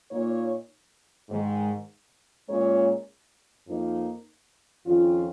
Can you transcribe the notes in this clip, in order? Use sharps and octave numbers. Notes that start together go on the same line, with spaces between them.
A#2 A#3 D#4 C#5
G#2 D#3 G#3
A#2 G#3 C#4 A#4 C#5
F2 F3 A#3 D#4 A#4
F2 D#3 C#4 F4